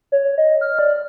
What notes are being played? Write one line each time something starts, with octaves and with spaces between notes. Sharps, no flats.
C#5
D#5
F6
D5